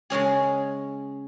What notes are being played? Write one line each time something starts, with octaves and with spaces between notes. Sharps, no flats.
C#3 G#3 C#4 G#4